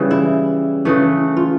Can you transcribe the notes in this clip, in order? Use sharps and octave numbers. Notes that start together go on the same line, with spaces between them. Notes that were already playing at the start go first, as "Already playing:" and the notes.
Already playing: C#3 E3 G3
E4
C#3 E3 A3
F4